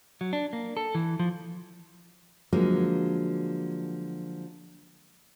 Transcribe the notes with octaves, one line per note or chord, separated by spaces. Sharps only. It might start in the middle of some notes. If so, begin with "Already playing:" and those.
F#3
D4
A#3
A4
E3
F3
D3 F3 F#3 G#3 A#3 D4